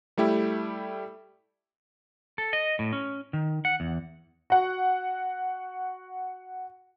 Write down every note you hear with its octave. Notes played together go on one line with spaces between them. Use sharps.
G3 A3 E4 G4
A4
D#5
A2
C#4
D#3
F#5
E2
F#4 F#5